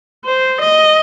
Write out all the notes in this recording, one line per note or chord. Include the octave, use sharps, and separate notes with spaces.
C5
D#5